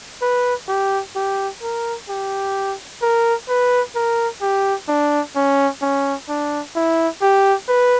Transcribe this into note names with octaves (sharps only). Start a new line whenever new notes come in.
B4
G4
G4
A#4
G4
A#4
B4
A#4
G4
D4
C#4
C#4
D4
E4
G4
B4